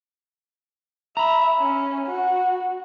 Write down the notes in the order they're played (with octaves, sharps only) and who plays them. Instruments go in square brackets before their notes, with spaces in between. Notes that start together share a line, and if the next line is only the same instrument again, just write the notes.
[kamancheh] E5 [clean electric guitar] A#5 B5
[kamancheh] C#4
F#4